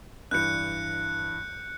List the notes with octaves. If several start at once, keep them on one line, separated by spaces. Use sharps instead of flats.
G2 E3 F#6 G6 C#7